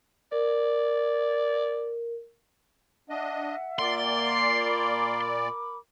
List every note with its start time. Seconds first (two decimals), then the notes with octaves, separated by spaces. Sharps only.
0.32 A#4 D5
3.10 D4 D#5 E5 F#5
3.79 A#2 A#3 D5 C6
4.66 A#4 B5 D6